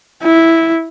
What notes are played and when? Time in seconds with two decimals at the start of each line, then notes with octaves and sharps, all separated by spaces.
0.23 E4